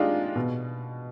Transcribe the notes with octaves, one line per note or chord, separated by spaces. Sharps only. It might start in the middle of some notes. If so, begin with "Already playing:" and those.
Already playing: G#3 D4 D#4 F4 G4
B2